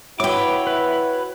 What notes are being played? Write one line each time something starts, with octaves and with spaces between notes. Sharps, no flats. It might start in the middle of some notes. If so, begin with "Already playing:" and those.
E4 F#4 B4 C#5 G5 D6
B4